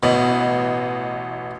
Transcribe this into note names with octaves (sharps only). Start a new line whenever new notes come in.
A1 B2 B3 D#5